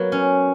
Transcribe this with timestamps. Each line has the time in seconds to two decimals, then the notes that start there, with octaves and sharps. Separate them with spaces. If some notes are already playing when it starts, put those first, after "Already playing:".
Already playing: F#3 A#3 B3
0.12 C#4